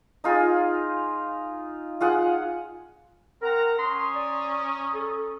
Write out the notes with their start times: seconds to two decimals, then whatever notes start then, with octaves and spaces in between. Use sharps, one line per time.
0.24 D#4 F4 G#4
2.01 F4 G#4 F#5
3.42 C4 A#4 F#5 A#5
3.79 C#4 A#5 C6 D#6
4.15 D5
4.94 A4